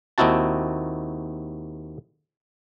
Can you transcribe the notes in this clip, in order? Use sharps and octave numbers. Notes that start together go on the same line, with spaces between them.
D#2 C4 D#4 E4 F#4 A5